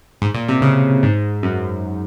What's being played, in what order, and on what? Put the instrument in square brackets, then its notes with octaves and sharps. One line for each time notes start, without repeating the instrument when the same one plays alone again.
[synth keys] G#2
A#2
C3
C#3
G#2
F#2